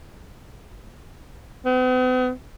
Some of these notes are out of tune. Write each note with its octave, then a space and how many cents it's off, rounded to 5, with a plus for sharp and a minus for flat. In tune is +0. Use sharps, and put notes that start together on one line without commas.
B3 +45